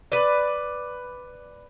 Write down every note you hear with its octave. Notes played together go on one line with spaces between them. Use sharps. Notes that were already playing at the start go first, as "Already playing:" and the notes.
B4 D5